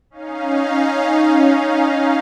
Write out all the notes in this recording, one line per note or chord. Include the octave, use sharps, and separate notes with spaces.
C#4 D#4 F5